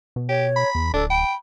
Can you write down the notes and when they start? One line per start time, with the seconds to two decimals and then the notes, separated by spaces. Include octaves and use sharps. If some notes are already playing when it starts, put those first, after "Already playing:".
0.16 B2
0.29 G4 C#5
0.56 B5
0.75 E2
0.94 D1 D4 A4
1.10 G5 B5